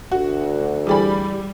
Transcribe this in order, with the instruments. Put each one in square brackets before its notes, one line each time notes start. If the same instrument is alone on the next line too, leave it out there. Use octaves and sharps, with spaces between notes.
[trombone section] D2 [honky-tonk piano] F#4
[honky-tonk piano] E3 D5 B5 [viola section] G3 [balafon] G#4 G5 G#5